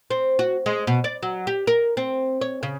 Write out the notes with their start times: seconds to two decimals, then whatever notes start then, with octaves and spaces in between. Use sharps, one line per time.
0.10 C4
0.39 F#4
0.66 G#3
0.87 B2
1.04 D5
1.23 F#3
1.47 G4
1.67 A#4
1.97 C4
2.41 C#5
2.63 C#3